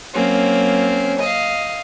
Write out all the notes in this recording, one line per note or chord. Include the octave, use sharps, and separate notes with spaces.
F#3 A#3 C4 C#4
D#5 F5